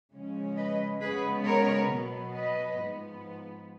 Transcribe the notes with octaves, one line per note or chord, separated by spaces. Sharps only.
C#3 F3 G#3 C#4
B4 D#5
C#3 G#3 B3 G#4 B4
A#4 C#5
B2 F#3 B3
B4 D#5
G#2 F3 B3